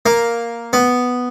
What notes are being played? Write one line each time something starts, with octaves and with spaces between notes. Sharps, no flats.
A#3
B3